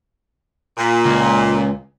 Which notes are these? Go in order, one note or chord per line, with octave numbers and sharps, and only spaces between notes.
A#2
C#2